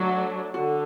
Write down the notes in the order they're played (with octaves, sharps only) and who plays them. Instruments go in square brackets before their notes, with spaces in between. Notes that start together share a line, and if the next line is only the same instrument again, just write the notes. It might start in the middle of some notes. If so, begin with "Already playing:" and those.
Already playing: [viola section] F#3 A3 D4 [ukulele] F#4
[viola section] D3 [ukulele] F#4